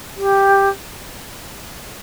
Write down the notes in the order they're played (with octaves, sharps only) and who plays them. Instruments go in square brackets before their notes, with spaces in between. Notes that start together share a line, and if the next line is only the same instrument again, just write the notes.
[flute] G4